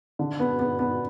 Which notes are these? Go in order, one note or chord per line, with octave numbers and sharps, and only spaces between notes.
D3
B3
B3
B3